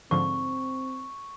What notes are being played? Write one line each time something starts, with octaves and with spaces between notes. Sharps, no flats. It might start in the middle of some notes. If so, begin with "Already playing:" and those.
G#2 D3 F3 C4 C#6